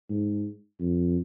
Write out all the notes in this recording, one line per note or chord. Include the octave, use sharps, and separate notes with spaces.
G#2
F2